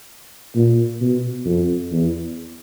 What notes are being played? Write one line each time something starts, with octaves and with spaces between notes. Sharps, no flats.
A#2
B2
F2
E2